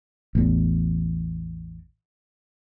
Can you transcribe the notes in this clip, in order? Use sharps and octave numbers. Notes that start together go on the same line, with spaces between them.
A1 E2